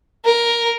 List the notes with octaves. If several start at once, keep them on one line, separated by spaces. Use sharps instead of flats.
A#4